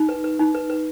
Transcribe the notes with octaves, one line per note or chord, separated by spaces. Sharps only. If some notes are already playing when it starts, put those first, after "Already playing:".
Already playing: D#4
B4
B4
D#4
B4
B4